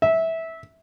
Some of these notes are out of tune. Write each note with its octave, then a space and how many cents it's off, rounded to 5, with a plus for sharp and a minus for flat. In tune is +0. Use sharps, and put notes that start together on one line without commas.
E5 -15